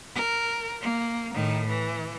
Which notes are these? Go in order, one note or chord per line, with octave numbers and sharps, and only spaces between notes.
A#4
A#3
A2 D#3
E3